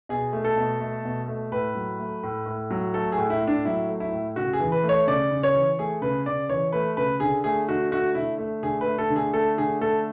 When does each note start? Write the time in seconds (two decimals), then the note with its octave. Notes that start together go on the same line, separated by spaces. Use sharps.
0.09 B2 G#4
0.33 A3
0.45 A4
0.57 B2
0.80 A3
1.05 B2
1.28 A3
1.52 A2 B4
1.75 F#3
1.99 A3
2.23 A2
2.46 A2
2.71 F#3
2.94 A3 A4
3.12 G#4
3.18 A2
3.30 E4
3.41 A2
3.47 D4
3.65 F#3 E4
3.89 A3
4.00 E4
4.12 A2
4.36 C#3 F#4
4.53 G#4
4.60 E3
4.72 B4
4.84 A3
4.89 C#5
5.07 C#3 D5
5.31 C#3
5.43 C#5
5.54 E3
5.79 A3 G#4
6.02 C#3 B4
6.26 C#3 D5
6.49 E3 C#5
6.73 A3 B4
6.97 C#3 B4
7.20 D3 G#4
7.44 A3 G#4
7.68 D3 F#4
7.91 A3 F#4
8.15 D3 E4
8.38 A3
8.63 D3 G#4
8.81 B4
8.86 A3
8.98 A4
9.10 D3
9.16 G#4
9.34 A3 A4
9.58 D3 G#4
9.81 A3 A4